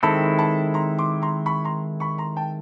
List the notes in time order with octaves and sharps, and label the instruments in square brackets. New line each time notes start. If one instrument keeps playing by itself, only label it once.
[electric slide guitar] D#3 G#3 C4 E4 A4 [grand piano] A5 B5
[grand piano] A5 B5
A#5 C6
C6 D6
A#5 C6
B5 C#6
A#5 C6
B5 C#6
A#5 C6
G5 A5